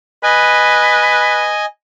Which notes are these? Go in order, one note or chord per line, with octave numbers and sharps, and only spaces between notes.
B4 D#5 G#5